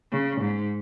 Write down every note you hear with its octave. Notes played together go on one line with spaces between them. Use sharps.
C#3
G#2